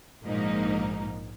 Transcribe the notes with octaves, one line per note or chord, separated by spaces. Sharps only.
A#1 G#2 F3 A#3 D#4